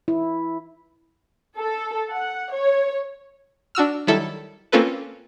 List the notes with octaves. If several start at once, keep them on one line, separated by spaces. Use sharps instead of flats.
E4
A4
F#5
C#5
D4 F#4 E6 F6
D#3 F#3 G3 E4 A4
A#3 C4 C#4 F4 A4 B4